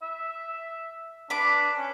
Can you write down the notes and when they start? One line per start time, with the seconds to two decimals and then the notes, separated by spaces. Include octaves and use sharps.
0.02 E5
1.30 D4 B4 D6
1.77 C#4